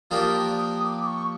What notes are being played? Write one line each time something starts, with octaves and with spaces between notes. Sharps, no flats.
F3 A#3 D4 G4 A#4 D#6
D#6
D#6
D6
D6
C#6